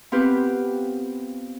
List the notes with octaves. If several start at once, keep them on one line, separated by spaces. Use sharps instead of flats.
B3 C4 F4 G4 B4